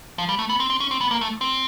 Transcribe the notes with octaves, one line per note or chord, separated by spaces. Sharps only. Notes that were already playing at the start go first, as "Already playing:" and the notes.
F3
G3
A3
B3
C4
C4
C#4
C4
B3
A#3
A3
C4